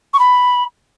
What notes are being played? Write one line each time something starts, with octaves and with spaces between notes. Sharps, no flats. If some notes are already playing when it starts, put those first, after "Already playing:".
C#6
B5